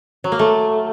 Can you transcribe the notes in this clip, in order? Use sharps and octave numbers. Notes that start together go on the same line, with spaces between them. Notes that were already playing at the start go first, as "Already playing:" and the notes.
F#3
A#3
A3